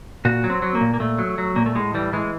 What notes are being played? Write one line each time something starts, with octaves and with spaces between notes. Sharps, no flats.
A#2 F#4
F#3
C4
F#3
A#3
A#2
A#3
A#2 A3
F#3
F#3
A#2 A#3
A3
A2 G#3
E3 G3
E3 G#3